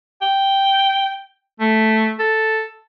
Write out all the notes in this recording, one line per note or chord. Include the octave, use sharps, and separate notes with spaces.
G5
A3
A4